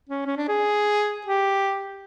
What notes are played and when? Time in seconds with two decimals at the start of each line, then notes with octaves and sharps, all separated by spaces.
0.09 C#4
0.26 C#4
0.37 D4
0.48 G#4
1.26 G4